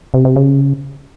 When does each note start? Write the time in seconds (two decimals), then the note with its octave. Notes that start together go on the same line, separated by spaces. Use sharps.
0.14 C3
0.25 C3
0.36 C#3